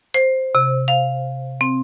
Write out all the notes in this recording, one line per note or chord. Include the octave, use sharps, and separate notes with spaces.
C5
C3
F5
C4